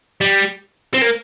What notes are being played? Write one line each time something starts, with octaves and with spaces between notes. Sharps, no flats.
G3
C4
A#3